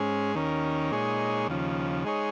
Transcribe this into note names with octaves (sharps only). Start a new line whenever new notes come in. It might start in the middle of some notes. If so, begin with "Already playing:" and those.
Already playing: G#2 G#3 C#4 G#4
D#2 D#3 C#4 A#4
A#2 G#3 D#4 G#4 C#5
D#2 C#3 F3
G#3 D#4 G#4 C#5